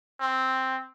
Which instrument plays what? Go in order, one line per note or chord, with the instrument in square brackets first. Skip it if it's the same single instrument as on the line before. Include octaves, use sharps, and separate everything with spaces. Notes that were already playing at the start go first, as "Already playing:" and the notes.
[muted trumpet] C4